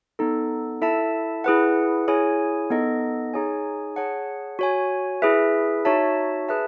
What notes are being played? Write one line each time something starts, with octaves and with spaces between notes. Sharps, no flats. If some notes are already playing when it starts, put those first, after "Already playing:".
B3 D#4 A4
E4 A4 E5 A5
E4 G#4 B4 F#5
E4 G#4 C#5 G#5
B3 D#4 A4 D#5
D#4 G#4 C#5 G#5
G#4 C#5 F#5 A5
F#4 C#5 G#5
E4 G#4 B4 E5
D#4 F#4 C#5 E5 A5
G#4 B4 E5 A5